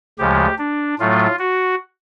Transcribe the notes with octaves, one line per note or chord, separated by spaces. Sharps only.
D2 C#3 F3 G#3 G4
D4
A2 F#3 A3 F4
F#4